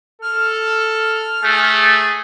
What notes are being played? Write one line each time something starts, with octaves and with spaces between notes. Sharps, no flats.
A4 F6
A3 G#4